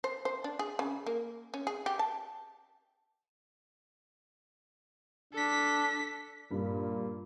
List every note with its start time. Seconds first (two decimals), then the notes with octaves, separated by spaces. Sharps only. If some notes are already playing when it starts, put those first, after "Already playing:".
0.04 C5
0.25 C5
0.44 D4
0.59 G#4
0.79 C#3
1.06 A#3
1.54 C#4
1.67 G#4
1.86 G4
1.99 A5
5.33 D4 A4 B6
6.51 G2 A#2